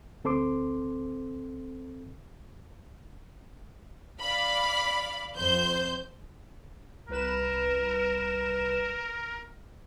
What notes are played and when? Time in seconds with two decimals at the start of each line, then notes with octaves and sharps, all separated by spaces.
0.24 D2 C4 A4 C5 C6 D6
4.21 D5 F5 B5
5.37 F2 C5 G6
7.09 C2 A#4 B4 E7